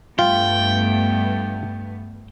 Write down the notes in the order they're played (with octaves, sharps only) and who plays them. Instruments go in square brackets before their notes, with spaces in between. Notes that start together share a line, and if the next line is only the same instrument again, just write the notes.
[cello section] G2 A3 B3 [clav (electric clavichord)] F4 [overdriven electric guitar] G5